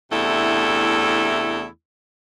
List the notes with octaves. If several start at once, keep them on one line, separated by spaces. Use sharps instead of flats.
E2 C3 A3 D4 E4